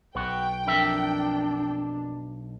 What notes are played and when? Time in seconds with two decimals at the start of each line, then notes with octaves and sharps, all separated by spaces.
0.15 B1 B3 F#4 G5
0.67 F2 D4 A#4 E5